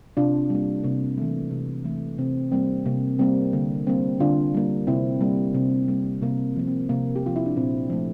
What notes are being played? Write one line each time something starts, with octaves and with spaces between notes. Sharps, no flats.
C3 D4 F4
G3 A#3
C3 A#3
E3 A3
C3
E3 A3
C3 C4
G3 A#3 C4
C3 A#3
G3 A#3 C4
D3 A#3
G3 A#3 C4
D3 D4 F4
G3 A#3
C3 C4 E4
G3 A#3
C3 C4
G3 A#3
C3 A#3
F3 A#3
C4
C3 A#3
G4
F3 A#3 F4
E4
D4
A#2 C4
F3 A3